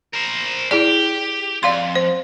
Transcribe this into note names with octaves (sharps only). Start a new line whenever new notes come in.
A#4 C5
E4 G4 G#4 D5
F2 D5 F5 C6
C5